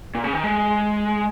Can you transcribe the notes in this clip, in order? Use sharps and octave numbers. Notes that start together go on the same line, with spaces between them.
A#2
C#3
D#3
G#3